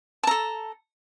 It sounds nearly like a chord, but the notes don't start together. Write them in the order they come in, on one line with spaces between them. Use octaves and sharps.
A5 A#5 A4